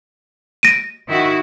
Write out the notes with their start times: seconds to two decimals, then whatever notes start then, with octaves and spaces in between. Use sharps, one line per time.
0.63 A#6 D7 D#7
1.08 D#3 E4 F#4